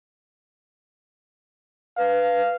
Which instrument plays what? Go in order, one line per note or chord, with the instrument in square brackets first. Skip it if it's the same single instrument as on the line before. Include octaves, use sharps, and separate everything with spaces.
[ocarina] B4 [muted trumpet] F5